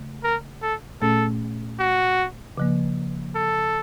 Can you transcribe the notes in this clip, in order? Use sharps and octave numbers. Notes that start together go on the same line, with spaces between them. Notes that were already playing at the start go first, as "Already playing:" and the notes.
Already playing: C#3 A3
A#4
A4
A#2 A3 C#4 A4
F#4
C#3 F3 A#3
A4